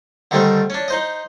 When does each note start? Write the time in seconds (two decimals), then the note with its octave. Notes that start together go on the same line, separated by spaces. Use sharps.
0.31 D3 D#3 G3 A3 C4
0.70 C#4 D4
0.88 D#4 C5 D#5